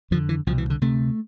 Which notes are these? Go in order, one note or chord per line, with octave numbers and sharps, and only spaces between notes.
F2 D3 F3
E3
C2 B2 F3
E3
D3
D2 C3 A3